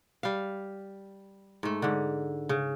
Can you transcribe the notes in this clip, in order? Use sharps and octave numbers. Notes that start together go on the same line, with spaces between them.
G3 F5
G#2 A3
G#2 D3
C#3